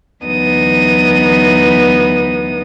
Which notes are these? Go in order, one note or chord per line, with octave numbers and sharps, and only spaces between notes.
D2 E3 F#3 B3 D#4 D#6